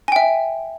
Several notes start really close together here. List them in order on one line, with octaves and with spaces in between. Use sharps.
G#5 G5 E5